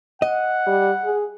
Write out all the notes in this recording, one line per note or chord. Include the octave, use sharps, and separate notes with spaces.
D#5 F#5
G3
G#4